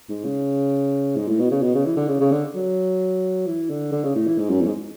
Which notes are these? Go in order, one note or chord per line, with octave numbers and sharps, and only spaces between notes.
G#2
C#3
G#2
A2
B2
C#3
B2
C#3
E3
D3
C#3
C#3
D3
F#3
E3
D3
D3
C#3
A2
E3
G#2
F#2
E2
G#2